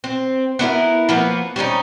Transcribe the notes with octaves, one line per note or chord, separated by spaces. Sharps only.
C4
B3 D4 E4 A#4
F3 A#3 B3 B4
G3 C4 C#4 D#4